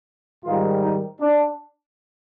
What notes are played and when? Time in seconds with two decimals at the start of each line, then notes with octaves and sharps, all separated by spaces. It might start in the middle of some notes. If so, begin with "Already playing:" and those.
0.43 G#2 D#3 G3 F4
0.82 D#4
1.20 D4